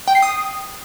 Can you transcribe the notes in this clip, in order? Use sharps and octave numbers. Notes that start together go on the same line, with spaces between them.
G5
C7
D#6